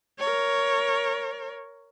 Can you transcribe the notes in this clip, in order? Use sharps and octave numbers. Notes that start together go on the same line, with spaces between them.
A#4 C#5